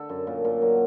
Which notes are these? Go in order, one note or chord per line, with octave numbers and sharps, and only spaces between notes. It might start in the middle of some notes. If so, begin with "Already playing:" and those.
Already playing: D3 A4
F#2
A#2
A#2
F#3